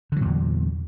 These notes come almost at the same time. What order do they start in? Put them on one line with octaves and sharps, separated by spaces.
D3 F#3 A#2 E2